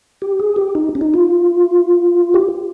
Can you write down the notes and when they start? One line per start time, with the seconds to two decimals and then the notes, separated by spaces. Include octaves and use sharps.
0.22 G4
0.40 G#4
0.56 G4
0.75 D#4
0.95 C#4
1.01 D#4
1.14 F4
2.34 G4